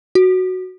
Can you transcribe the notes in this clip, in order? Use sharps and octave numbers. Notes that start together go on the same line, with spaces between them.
F#4